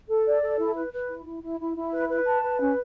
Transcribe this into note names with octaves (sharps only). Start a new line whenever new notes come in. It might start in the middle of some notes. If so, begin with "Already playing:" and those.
A4
D5
A4
E4
B4
B4
E4
E4
E4
E4
E4
B4
B4
A5
B4
C#4